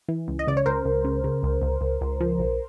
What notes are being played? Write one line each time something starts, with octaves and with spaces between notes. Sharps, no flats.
E3
C#2
D#5
C#3 D5
C#5
C#2 A#4 C5
C#2
C#3
C#3
C#2
C#2
C#2
C#2
F3
B1